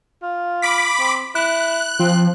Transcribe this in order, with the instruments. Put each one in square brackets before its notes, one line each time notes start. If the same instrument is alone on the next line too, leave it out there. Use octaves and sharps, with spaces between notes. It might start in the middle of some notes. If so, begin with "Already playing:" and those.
[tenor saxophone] F4
[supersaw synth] B5 D6 B6
[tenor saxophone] C4
[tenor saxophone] E4 [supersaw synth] F#6
[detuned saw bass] F3 [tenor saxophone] C4